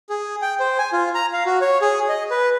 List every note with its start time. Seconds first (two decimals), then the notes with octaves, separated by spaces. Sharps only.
0.10 G#4
0.42 G5
0.60 C5
0.78 G#5
0.93 F4
1.15 A#5
1.33 F5
1.46 F#4
1.61 C#5
1.82 G#4
2.09 D#5
2.31 B4